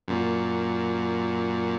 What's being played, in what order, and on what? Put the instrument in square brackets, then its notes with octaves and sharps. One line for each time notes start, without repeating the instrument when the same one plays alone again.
[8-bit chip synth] F#2 A#2